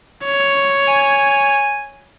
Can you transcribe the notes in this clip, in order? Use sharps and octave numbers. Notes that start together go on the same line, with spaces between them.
C#5
G#5